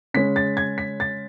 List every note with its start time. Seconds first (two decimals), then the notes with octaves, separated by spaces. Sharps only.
0.14 C#3 G#3 C#4 B6
0.36 A6
0.57 G#6
0.78 B6
1.00 A6